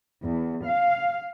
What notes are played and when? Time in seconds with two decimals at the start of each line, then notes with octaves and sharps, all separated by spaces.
0.25 E2
0.65 F5